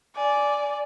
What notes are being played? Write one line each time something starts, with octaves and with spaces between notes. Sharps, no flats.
D5 G#5